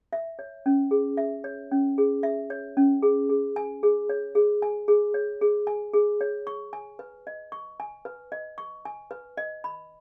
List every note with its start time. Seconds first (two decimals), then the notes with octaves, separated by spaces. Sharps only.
0.13 E5
0.39 C#5
0.66 C#4
0.91 G#4
1.17 E5
1.44 C#5
1.71 C#4
1.98 G#4
2.23 E5
2.50 C#5
2.77 C#4
3.02 G#4
3.29 G#4
3.56 G#5
3.83 G#4
4.09 C#5
4.35 G#4
4.62 G#5
4.88 G#4
5.14 C#5
5.41 G#4
5.67 G#5
5.94 G#4
6.21 C#5
6.47 C#6
6.73 G#5
6.99 B4
7.27 D#5
7.52 C#6
7.80 G#5
8.05 B4
8.32 D#5
8.58 C#6
8.85 G#5
9.11 B4
9.37 D#5
9.64 B5